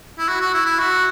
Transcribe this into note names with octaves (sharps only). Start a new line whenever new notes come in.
E4
F#4
F#4
E4
E4
F#4